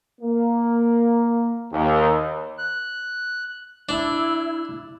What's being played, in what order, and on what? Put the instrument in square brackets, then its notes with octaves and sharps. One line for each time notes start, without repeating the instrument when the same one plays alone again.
[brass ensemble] A#3
D#2
[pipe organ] F#6
[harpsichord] D4 [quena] E4